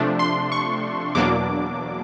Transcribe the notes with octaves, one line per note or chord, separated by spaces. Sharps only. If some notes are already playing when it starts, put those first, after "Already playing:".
Already playing: C3 F3 A3 D4
C6
C#6
E2 B2 F#3 A#3 D4 D6